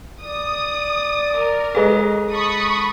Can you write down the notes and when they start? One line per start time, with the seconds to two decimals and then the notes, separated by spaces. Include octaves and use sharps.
0.22 D5 D#6
1.36 A#4
1.75 G#3 G#4 A4 B4 D#5
2.30 A5 B5 C#6 D#6